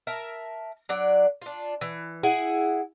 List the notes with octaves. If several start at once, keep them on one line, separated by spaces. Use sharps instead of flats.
A#4 E5 A5
F#3 D4 D5
D4 F4
E3
E4 G#4 F#5